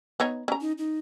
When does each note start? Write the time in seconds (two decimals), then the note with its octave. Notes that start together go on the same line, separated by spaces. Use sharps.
0.20 B3 D#4 C#5
0.48 C#4 A#5
0.61 D#4
0.78 D#4